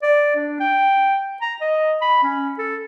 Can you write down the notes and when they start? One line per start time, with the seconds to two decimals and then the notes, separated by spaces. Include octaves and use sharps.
0.03 D5
0.36 D4
0.60 G5
1.42 A#5
1.61 D#5
2.02 B5
2.23 C#4
2.58 A4